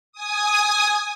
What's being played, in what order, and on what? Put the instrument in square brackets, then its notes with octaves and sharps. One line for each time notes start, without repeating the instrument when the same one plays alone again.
[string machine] G#5 D#6